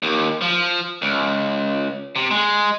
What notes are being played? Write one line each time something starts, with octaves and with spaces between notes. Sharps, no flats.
D#2
F3
C#2
C3
G#3